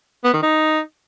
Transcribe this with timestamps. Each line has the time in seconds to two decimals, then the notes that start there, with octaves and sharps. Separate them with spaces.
0.25 B3
0.34 D#3
0.43 D#4